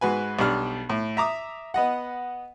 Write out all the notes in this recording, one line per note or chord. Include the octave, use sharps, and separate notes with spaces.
G#2 F#4 B4 G#5
B1 G3 D4 F6
A2
E5 A#5 D6 D#6
B3 D#5 F#5